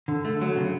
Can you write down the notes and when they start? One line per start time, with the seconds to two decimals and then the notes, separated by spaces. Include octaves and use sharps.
0.08 D3
0.25 A3
0.41 F#3
0.57 C#3